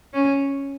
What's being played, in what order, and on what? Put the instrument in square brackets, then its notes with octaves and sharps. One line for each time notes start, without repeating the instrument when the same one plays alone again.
[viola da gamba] C#4